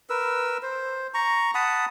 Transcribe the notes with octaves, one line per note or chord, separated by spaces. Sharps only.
A#4 B4 E6
C5
A#5 C#6
F#5 A5 B5 D#6